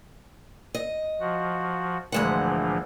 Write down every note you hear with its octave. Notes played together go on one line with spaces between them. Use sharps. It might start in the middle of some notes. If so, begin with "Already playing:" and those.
D#5
F3 F#4
D2 A#2 E3 F3 G#3 F#5